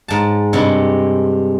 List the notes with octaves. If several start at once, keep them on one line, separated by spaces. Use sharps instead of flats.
G#2 A5
G2 C3 G#3